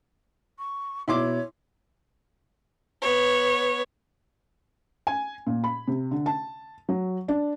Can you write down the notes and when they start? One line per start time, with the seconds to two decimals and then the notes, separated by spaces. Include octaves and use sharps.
0.58 C#6
1.08 B2 E4 C#5 C6 D6
3.02 B3 C#5
5.07 G#5
5.47 A#2
5.64 B5
5.87 C3
6.11 D3
6.26 A5
6.89 F#3
7.28 D4